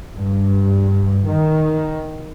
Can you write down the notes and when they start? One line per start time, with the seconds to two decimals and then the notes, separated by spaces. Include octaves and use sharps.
0.16 G2
1.28 D#3